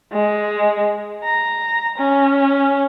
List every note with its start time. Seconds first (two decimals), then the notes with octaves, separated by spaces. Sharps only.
0.13 G#3
1.24 A#5
1.98 C#4